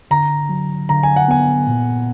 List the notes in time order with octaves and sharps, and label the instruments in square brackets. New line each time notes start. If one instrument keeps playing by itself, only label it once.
[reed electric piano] D3 [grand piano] A#5
[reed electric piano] F#3
[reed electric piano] D3 [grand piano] A#5
[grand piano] G#5
F#5
[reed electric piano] B3 [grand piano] G#5
[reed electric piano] A#2